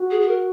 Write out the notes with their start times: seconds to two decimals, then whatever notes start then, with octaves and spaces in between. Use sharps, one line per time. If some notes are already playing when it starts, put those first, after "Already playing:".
Already playing: F#4
0.11 G#4
0.21 G#4
0.28 A#4